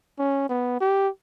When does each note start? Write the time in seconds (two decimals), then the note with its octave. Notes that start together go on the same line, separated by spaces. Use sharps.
0.19 C#4
0.49 B3
0.81 G4